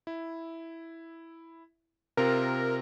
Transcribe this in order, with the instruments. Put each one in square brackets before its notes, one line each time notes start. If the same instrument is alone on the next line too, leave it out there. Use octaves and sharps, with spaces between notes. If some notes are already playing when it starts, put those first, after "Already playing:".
[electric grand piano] E4
[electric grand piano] C3 C4 F4 [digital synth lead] A#4